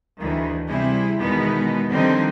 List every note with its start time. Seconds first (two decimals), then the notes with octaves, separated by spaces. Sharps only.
0.21 D2 D#3 E3
0.68 C3 G3 E4 G#4
1.20 E2 B2 D#3 G#3 B3 D#4
1.91 D3 D#3 F3 G3 C4 D#4